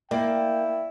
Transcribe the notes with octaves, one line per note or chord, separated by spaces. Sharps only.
A#3 E4 D5 G5